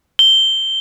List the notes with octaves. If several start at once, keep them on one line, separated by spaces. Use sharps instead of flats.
G7